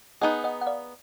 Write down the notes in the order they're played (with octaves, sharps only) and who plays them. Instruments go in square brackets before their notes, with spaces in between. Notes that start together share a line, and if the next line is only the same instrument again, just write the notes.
[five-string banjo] B3 D#4 G#4 [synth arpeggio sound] D#5 F#5
[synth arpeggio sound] D#5 F#5
F#5
D5 F5